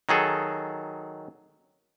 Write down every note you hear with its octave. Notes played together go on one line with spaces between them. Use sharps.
D#3 F#3 G#4 A4